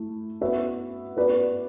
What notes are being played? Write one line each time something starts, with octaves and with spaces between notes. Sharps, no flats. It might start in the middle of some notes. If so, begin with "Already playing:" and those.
Already playing: A3 E4
B3 F#4 B4 E5
B3 F#4 B4 D5